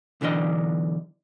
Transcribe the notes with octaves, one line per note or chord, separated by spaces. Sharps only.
B1 D3 E3 D4 D#5